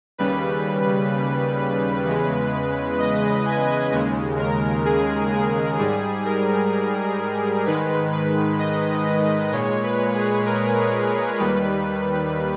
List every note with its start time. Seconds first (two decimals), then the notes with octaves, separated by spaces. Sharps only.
0.18 D#2 C#3 G3 B4
2.05 E2 C#3 G#3
2.98 D#5
3.45 G#5
3.92 D#2 C#3 G#3
4.39 A#4
4.86 G#4
5.32 G#4
5.79 G#2 G3 G#4
6.26 A#4
7.66 G#2 D#3 G#3 B4
8.13 B4
8.59 D#5
9.52 A#2 G#3 C#5
9.84 B4
10.15 G#4
10.46 A#4
11.39 D#2 D#3 G3 B4